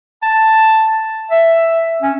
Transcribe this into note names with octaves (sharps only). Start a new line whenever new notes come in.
A5
E5
C#4